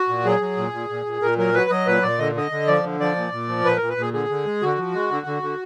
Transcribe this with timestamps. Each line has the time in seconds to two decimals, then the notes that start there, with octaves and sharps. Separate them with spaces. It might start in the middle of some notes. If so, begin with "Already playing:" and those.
Already playing: F#4
0.09 A#2
0.25 F#3 G#4
0.41 F#3
0.57 A#2
0.73 A#2
0.89 A#2
1.06 A#2
1.22 A#2 A#4
1.38 F#3 A#4
1.54 F#3 B4
1.70 F#3 D#5
1.87 A#2 B4
2.02 A#2 D5
2.19 D3 D#5
2.35 D3 D#5
2.51 D3
2.68 F3 D5
2.84 D3
3.00 F3 D5
3.16 A#2
3.32 A#2
3.48 F3
3.65 A#2 B4
3.77 A#2 A#4
3.89 B4
3.97 A#2 G#4
4.13 D3 G#4
4.29 D3
4.45 G#3
4.62 D3 F#4
4.78 F3
4.94 G#3
5.10 D3
5.27 D3
5.43 D3